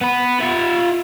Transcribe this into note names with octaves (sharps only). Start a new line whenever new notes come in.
B3 B4
F4 E5